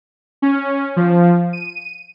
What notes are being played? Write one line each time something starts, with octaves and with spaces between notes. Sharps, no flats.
C#4
F3
D#7